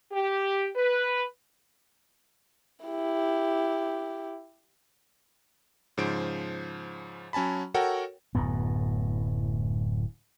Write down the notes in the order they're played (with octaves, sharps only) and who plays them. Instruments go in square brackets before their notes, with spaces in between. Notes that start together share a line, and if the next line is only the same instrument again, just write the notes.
[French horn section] G4
B4
[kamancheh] E4 G4
[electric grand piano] G#2 C#3 F3 C5 D7
F#3 C#4 G#5 A5 B5
F#4 A4 A#4 C#5 F#5 G5
[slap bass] D1 F#2 A2 B3